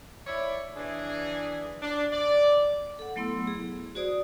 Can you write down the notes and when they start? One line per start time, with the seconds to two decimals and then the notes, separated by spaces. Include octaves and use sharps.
0.27 E4 C#5 D5
0.77 E3 D4 G#4
1.82 D4
2.13 D5
2.99 A4 F#5
3.16 F#3 A3 B3 E4 C6 E6
3.47 G#4
3.95 F#4 G#4 C5 D5 D#6